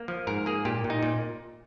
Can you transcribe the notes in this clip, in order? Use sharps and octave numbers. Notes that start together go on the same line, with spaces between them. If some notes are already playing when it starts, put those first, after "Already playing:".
Already playing: A#3
F3
G#2 A#4
A#3 G#4
A#2 G4
A#2
D#4
A#2